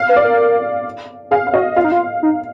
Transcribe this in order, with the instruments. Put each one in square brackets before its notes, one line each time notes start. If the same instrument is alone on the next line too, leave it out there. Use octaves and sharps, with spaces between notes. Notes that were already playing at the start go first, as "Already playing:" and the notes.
Already playing: [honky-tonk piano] F5
[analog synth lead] B4
[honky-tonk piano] D5
[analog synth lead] A#4
[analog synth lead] G#4 [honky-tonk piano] F5
[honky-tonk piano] F5
[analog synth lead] F#4 [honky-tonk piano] D#5
[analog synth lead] F4 [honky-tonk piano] F5
[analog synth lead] D#4
F4
D#4